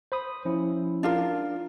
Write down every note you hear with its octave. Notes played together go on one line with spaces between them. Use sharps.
C5 B5 D#6
F3 C#4 E4
D4 F4 A#4